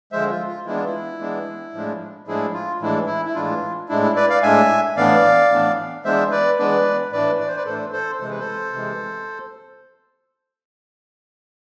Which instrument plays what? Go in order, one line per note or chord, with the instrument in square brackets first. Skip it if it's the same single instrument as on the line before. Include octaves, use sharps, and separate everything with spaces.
[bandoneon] D3 F3 G#3 C5 E5
F4
F4
E3 G#3 B3 D4 E4
F4
E4
E3 G#3 B3 D4
A2 F3 G#3 D4
A2 F3 G#3 D4 E4 G#4
F4
A2 E3 G#3 D4 E4
E4
E4
A2 E3 G#3 D4 F4
A2 G#3 D4 E4
E4
B4 D5
D5 F5
A2 G#3 D4 E5 G#5
A2 E3 B3 D4 D5 F5
A2 E3 B3 D4
E3 G#3 B3 D4 C5 E5
B4 D5
E3 G#3 B3 D4 B4 D5
A2 E3 A3 D4 B4 D5
D5
C5
B4 D5
A2 E3 A3 D4 A4 C5
A4 C5
C3 E3 G#3 C5
B4
A4 C5
C3 E3 G#3